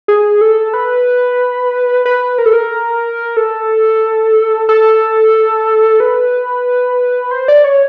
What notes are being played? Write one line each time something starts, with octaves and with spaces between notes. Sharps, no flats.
G#4
A4
B4
B4
A#4
A4
A#4
A4
A4
B4
C5
D5
C#5